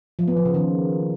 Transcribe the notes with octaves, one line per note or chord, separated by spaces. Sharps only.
F3
B3
F3
C#3
D#3